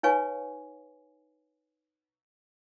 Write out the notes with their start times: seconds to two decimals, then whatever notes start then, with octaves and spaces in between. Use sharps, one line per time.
0.03 D#4 B4 C#5 F5 G#5 C#6